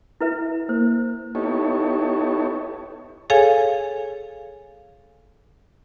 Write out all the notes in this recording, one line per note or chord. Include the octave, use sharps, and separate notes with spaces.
E4 B4 E5
A#3 C5
B3 D#4 E4 G4 A4 C#5
G#4 A4 C#5 F5 G#5